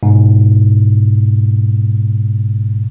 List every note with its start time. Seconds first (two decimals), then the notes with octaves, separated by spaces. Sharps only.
0.03 G#2 B2